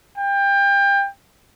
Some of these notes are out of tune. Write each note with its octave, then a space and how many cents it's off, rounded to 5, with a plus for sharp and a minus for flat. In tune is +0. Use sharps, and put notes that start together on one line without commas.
G5 +25